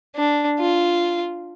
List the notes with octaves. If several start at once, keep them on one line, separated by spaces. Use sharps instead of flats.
D4
F4